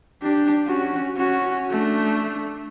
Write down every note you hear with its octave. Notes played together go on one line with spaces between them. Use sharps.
D4 G4
C#4 F#4
C#4 F#4
A3 D4